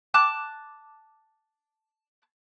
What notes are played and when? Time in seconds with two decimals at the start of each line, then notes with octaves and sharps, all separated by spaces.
0.14 A5 D6 F#6